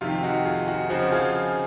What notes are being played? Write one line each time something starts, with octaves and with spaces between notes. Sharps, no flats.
F2 C3 D#3 F4
D#4 F#4
F4 G#4
D#4 F#4
C#3 F3 C4 D#4 F#4
F4 G#4